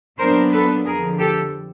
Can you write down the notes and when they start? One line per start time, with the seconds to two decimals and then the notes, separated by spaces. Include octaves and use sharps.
0.19 A#2 F#3 B3 D4 A#4 C5
0.52 A4 B4
0.85 F2 D3 F3 G#4 A#4
1.19 G4 A4